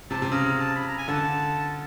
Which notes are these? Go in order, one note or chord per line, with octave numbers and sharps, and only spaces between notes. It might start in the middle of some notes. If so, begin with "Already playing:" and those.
C3 A5
C3
C#3 A#5
A#5
A#5
A5
B5
A#5
G#5
D3 A5